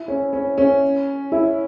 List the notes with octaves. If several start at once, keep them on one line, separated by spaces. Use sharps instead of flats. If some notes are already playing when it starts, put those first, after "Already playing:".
Already playing: E4
C#4
C#4
C#4
E4